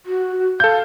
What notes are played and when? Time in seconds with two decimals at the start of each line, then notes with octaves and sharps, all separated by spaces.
0.06 F#4
0.60 A4 F5 G6